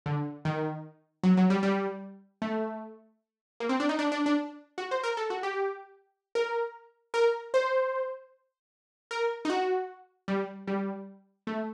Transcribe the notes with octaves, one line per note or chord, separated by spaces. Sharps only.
D3
D#3
F#3
F#3
G3
G3
A3
A#3
C4
D4
D#4
D4
D4
D4
F#4
C5
A#4
A4
F#4
G4
A#4
A#4
C5
A#4
D#4
F#4
G3
G3
A3